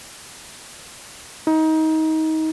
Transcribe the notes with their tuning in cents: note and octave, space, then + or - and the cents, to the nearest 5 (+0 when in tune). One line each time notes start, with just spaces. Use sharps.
D#4 +25